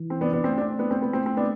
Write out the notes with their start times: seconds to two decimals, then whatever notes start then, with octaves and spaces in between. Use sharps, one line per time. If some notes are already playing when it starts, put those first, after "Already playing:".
Already playing: E3
0.10 C4
0.21 B3 D4
0.33 B3 D4
0.44 A3 C4
0.58 D4
0.61 C4
0.79 B3 D4
0.91 C4
1.02 B3
1.13 A3 C4
1.26 C4
1.37 B3 D4